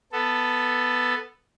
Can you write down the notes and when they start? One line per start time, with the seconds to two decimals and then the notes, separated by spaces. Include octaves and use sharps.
0.12 B3 A4